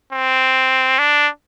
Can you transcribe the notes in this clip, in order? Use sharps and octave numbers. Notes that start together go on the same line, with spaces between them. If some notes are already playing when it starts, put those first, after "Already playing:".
C4
D4